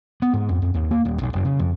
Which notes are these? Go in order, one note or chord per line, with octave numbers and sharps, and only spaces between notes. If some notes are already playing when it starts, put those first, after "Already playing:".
B3
G#2
F2
F2
D#2
A#3
D#1
B1
F#1
C#3
F2